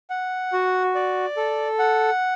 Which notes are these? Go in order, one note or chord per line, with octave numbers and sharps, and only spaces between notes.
F#5
F#4
D5
A4
F#5